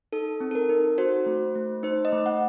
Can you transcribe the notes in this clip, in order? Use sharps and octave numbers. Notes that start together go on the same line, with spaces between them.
D#4 A4
C4
A4
A#4
D#4
F#4 C5
A3
A3
D#4 C5
D#5
A3
F#5